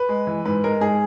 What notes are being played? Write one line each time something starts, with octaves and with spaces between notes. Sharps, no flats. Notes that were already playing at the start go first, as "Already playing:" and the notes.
Already playing: B4
G#3
E3
G#2 B4
G#3 A#4
G#2 G#4